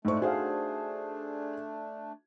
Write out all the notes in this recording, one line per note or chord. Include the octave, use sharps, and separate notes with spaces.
A2 A3 D4 D#4 C5 C#6
F#4 G#4 C5 F5 G#5